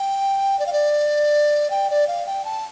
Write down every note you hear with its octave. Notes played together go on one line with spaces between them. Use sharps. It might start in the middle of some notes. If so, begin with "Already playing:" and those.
Already playing: G5
D5
F5
D5
G5
D5
F5
G5
A5